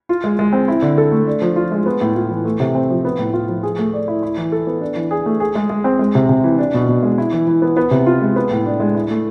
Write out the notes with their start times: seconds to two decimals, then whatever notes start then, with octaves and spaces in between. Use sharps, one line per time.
0.09 F4
0.24 G#3
0.39 G#3
0.53 C4
0.68 E4
0.82 D3
0.98 A4
1.12 A3
1.27 D4
1.42 F3
1.56 F4
1.72 G#3
1.86 B3
2.01 A2
2.16 F4
2.30 E3
2.45 A3
2.60 C3
2.75 C4
2.90 F3
3.05 B3
3.19 A2
3.33 F4
3.49 F3
3.63 G#4
3.79 A3
3.94 D5
4.08 E4
4.23 E4
4.37 E3
4.52 A4
4.67 B3
4.81 D4
4.96 E3
5.11 G#4
5.26 A3
5.40 G#4
5.55 G#3
5.70 G#3
5.84 C4
5.99 G#3
6.15 C3
6.29 C3
6.44 E3
6.58 D4
6.74 B2
6.88 B2
7.03 G#3
7.18 E4
7.33 E3
7.47 E3
7.62 B3
7.77 B3
7.91 C3
8.06 F4
8.21 G#3
8.36 B3
8.51 A2
8.66 D4
8.80 G#3
8.95 E4
9.10 A3